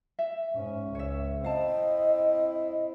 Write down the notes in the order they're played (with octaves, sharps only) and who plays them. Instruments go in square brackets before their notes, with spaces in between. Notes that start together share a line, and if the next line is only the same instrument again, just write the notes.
[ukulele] E5
[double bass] G#2 C#4
[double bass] C#2 [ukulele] C#5 E5
[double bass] C4 E4 [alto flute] D#5 [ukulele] F5 A5